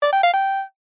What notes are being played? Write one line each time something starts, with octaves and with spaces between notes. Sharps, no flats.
D5
G5
F5
G5